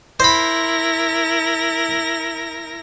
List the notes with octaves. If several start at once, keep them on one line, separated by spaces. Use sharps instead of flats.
E4 A#4 C5 B5 A#6